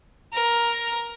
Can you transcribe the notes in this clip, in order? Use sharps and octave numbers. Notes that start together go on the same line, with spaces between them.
A#4